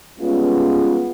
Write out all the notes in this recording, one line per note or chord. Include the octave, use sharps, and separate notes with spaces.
G3 G#3 B3 C#4 F4